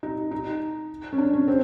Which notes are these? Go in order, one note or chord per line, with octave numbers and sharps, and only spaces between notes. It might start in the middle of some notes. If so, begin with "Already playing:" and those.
D#4
D#4
C#4
D4
C#4
C4